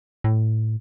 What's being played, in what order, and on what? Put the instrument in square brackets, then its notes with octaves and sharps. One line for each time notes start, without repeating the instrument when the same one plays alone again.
[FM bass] A2